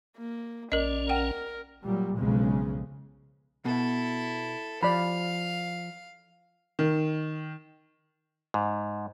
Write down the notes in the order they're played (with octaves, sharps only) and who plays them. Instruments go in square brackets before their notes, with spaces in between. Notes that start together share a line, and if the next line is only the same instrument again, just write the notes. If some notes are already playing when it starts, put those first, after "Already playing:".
[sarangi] A#3
[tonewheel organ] A#1 C#4 [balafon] A#4 D#5 [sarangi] D5
[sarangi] A#4 [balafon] F#5 G5
[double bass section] A#2 F#3 G3
B1 F2 C#3 G#3
[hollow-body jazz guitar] B2 [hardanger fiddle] E4 A4
[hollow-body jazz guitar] F3 [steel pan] D5 B5 [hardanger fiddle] F5
[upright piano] D#3
[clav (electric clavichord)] G#2